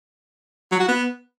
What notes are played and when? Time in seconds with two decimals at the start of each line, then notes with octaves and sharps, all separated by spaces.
0.72 F#3
0.80 F#4
0.88 B3